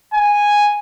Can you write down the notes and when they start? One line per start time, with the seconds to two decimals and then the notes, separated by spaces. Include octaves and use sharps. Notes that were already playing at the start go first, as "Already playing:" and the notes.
0.14 G#5